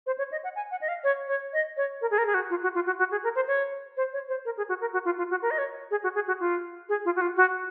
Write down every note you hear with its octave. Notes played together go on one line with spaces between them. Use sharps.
C5
C#5
D#5
F#5
G#5
F#5
D#5
F5
C#5
C#5
D#5
C#5
A#4
G#4
A#4
G#4
F#4
F4
F#4
F4
F#4
F#4
G#4
A#4
C5
C#5
C5
C#5
C5
A#4
G#4
F#4
A#4
F#4
F4
F4
F#4
A#4
D#5
C#5
G#4
F#4
G#4
F#4
F4
G#4
F4
F#4
F4
F#4